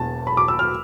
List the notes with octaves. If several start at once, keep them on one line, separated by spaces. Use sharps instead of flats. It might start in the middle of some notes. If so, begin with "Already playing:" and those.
Already playing: E1 E2 A5
B5
D6
E6
F6